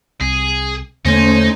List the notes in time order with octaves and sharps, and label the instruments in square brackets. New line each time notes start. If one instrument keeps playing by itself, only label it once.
[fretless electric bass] C2 [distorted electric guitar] G#4
[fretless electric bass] E2 D3 A#3 [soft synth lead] A3 [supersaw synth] C#4 C5 G#6 [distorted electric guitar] D#4